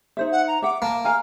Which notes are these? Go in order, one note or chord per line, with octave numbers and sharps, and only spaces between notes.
D#4 C5 E5
F#5
A#5
E5 F#5 D6
A#3 A5
F5 G#5 A#5 F6